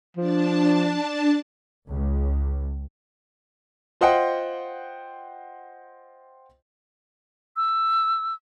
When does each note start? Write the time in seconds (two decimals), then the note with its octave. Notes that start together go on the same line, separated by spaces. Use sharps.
0.17 F3 D4 A5
1.90 C#2
4.01 F4 C5 D#5 F#5 G5
7.56 E6